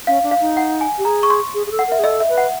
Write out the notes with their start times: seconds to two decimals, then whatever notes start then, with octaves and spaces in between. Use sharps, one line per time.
0.07 C#4 F5
0.23 D4
0.31 F5
0.40 D#4
0.57 F#5
0.81 G#5
0.98 G4
1.05 G#4 A#5
1.23 C#6
1.30 C6
1.54 G#4
1.67 G#4
1.71 A4
1.79 F#5
1.88 A#4 E5
1.99 G#4
2.04 A4 D#5
2.20 E5
2.29 B4
2.38 F#5